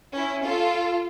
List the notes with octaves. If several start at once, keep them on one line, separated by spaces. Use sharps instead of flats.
C#4 E4
F4 A4